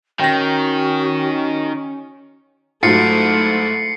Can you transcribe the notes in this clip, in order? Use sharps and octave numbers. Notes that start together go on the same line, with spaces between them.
D#3 C#4 F#4 G5 A#6
G#2 F#3 A3 E4 F4 A6 C7 C#7